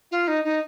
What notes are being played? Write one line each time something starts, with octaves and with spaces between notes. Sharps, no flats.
F4
D#4
D#4